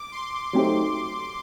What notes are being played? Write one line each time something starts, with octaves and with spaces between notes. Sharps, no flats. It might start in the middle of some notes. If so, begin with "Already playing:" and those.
Already playing: D6
C6
F#3 A3 D#4 G4 C5